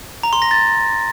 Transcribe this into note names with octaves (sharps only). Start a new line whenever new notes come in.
A#5
C6
A#6
A6